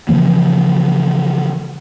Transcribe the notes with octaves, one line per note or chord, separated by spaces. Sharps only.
C#3 E3 F3 A#3